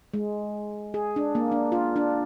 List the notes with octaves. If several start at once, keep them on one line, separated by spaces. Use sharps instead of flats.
G#3
G#4
D4
A#3
D4
F4
D4